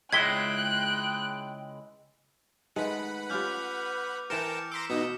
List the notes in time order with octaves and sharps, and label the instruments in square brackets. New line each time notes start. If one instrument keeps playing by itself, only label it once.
[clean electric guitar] C#2 G#3 E4 [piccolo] G5 [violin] F#6 [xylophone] G#6 B6 G7
[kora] D#3 G#3 A3 [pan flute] B4 [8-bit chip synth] F#5 B5
[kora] C#4 F4 G4 [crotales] D6 F6 G6
[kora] E3 C5 [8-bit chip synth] A#4 G5 A5 [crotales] C#7 E7
[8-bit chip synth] A#5 C6 D6 [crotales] E6 B6
[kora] B2 [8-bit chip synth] B3 D#4 [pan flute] D#6